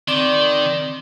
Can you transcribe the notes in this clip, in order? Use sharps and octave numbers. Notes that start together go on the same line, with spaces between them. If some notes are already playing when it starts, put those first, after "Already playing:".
D#3 C4 D5 D6